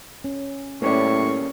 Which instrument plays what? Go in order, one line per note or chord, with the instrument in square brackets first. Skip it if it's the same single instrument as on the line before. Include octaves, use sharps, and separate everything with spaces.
[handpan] C#4
[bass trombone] A2 [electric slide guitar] A#3 C#4 G4 [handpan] B4 D5 [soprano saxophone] C#6